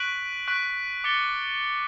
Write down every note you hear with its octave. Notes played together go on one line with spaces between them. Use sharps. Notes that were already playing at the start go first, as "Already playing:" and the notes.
Already playing: C#6 F#6 B6 D7 F#7
C#6 F#6 B6 D7 F#7
D6 A6 C#7 G7